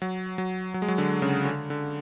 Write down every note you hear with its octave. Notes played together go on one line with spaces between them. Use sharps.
F#3
F#3
F#3
G#3
F#3
D3
C#3
D3
D3